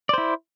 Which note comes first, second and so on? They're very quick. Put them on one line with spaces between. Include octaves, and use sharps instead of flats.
D5 C5 E4